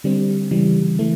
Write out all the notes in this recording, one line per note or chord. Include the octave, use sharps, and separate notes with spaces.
D3 G3 C4
C#3 E3 G3
E3 A3